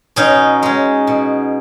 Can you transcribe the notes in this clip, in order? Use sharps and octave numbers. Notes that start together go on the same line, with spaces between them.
B2 C#4 D#4
G#3 C#4
B2